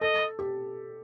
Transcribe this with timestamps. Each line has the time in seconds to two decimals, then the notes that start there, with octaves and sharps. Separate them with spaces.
0.01 A4 D#5
0.39 G4